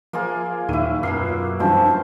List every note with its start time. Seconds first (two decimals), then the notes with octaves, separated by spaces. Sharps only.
0.13 F3 A#3 F4 G#4
0.69 D#2 A#2 D#3 F#3 E4 D#7
1.03 F#2 B2 F#3 A#3 F6 C7
1.22 F4
1.60 G2 D#3 F3 C4 C#4 C5 A5